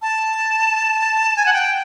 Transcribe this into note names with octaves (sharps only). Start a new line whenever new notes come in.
A5
G#5
F#5
G5